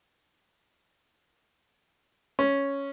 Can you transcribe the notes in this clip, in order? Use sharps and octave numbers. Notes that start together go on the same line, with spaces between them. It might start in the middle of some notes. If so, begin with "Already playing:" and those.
C#4